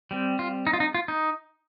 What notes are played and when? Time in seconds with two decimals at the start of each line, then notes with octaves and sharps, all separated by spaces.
0.11 G3 C4
0.39 F4
0.67 D#4
0.73 F4
0.80 D#4
0.95 F4
1.08 D#4